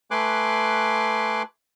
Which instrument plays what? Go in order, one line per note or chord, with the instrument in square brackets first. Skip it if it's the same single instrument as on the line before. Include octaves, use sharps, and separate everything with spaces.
[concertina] A3 B4 G#5 C6 D6 F#6